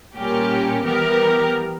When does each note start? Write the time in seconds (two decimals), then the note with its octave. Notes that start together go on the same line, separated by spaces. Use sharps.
0.17 A#2 G3 C#4 G4 A#4
0.84 E3 G3 B3 G4 A#4